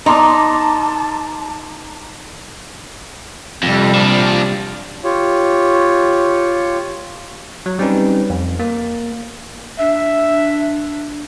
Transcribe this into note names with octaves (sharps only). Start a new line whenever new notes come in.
D#4 A5 A#5 C6 D6
F2 C3 G3
F3 D4
F4 G4 C#5
F#3
G3 C4 C#4 D#4 B4
F2
A#3
D4 E5